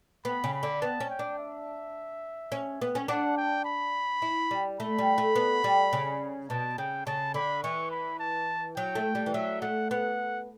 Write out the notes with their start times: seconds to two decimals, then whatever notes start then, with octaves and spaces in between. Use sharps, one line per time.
0.25 B3 B5
0.44 C#3
0.54 B5
0.63 D3
0.82 B3 A5
1.00 C#4
1.10 G5
1.19 D4
1.38 E5
2.52 C#4
2.81 B3
2.95 C#4
3.08 D4 F#5
3.37 G5
3.65 B5
4.22 E4
4.51 G3
4.80 A3 B5
4.98 G3
5.18 A3
5.36 B3
5.64 G3
5.93 C#3
6.50 B2 A5
6.78 C#3 G5
7.07 C#3 A5
7.34 D3 B5
7.63 E3 C#6
7.91 B5
8.20 A5
8.77 F#3 G5
8.95 A3
9.15 G3
9.26 E3
9.34 F#3 E5
9.62 A3 F#5
9.91 B3 F#5